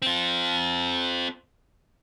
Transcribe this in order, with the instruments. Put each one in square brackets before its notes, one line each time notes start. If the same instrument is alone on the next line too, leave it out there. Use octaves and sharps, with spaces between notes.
[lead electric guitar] C4 F4